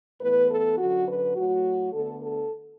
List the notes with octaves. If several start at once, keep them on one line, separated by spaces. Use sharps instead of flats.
A2 E3 B3 B4
A4
F#2 D3 F#3 F#4
B4
A2 F#3 A3 F#4
D2 D3 B3 A4
A4